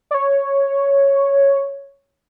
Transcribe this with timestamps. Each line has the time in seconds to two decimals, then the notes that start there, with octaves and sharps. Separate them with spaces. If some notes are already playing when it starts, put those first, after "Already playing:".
0.11 D5
0.14 C#5